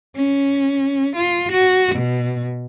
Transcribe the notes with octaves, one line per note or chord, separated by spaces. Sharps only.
C#4
F4
F#4
B2